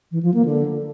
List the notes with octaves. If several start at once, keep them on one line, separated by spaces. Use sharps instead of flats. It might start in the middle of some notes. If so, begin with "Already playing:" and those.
E3
F3
A#3
D3